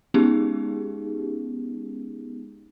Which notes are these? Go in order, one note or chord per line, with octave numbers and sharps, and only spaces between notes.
G#3 B3 C#4 D#4 G4 G#4